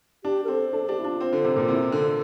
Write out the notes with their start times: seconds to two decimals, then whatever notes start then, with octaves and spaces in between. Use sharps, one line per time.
0.24 D4 G4
0.44 A#4
0.48 C4 A4
0.73 D4 A4
0.84 A4
0.89 D4 G4
0.99 E4
1.04 D4 F4
1.20 C4
1.33 D3
1.44 C3
1.56 A#2
1.68 C3 E4
1.84 C4
1.92 D3
2.01 A#3